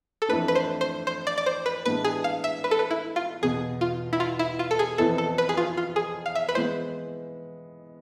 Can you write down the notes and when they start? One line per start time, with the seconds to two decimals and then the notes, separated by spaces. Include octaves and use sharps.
0.22 A4
0.29 F2 E3 A3 D4 B4
0.48 B4
0.55 C5
0.81 C5
1.07 C5
1.27 D5
1.38 D5
1.46 C5
1.66 B4
1.86 A2 E3 G#3 B3 D4 B4
2.05 G#4
2.24 F5
2.44 E5
2.64 B4
2.71 A4
2.79 B4
2.91 E4
3.16 F4
3.42 E2 B2 B3 G#4
3.81 F4
4.13 E4
4.20 F4
4.39 E4
4.59 F4
4.71 A4
4.79 G#4
4.98 F2 E3 B3 E4 A4
5.18 A4
5.38 B4
5.49 G#4
5.57 F4
5.77 F4
5.96 G#4
6.26 F5
6.35 E5
6.49 B4
6.55 E3 G#3 B3 C5